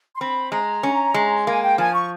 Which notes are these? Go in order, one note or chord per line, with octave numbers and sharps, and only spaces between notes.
C6
C4 B5
G#3 A#5
C#4
G#3
A#3 G#5
G5
F3 G#5
C#6